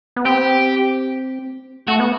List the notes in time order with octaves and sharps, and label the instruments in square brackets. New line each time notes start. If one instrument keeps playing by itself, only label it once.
[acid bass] B3
[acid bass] C4 [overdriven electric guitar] G4
[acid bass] A3 [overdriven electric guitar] F#4
[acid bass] B3